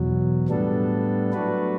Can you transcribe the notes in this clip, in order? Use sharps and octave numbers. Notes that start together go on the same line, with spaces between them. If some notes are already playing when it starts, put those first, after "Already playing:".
Already playing: E2 B2 F#3
A2 G3 B3 D4 A4
F#3 A3 D4 F#4 B4